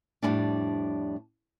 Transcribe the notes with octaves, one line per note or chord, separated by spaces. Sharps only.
F2 A2 G3 G#3 C#4 D4